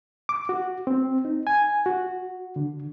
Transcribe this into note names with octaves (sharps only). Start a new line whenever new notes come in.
D6
F#4
C4
D#4
G#5
F#4
D3